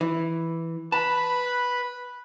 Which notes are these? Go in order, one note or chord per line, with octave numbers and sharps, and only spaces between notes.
E3
B4 A5 B5